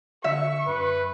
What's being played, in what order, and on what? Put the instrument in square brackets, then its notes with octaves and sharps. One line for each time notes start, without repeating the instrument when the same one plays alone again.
[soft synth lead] D3 [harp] E5 [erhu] C#6
[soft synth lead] F#2 [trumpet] B4